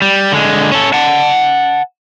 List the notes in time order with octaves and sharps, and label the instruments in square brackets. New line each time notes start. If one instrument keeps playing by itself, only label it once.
[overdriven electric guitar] G3
D3 G#3
C#4 A4
F#5 A5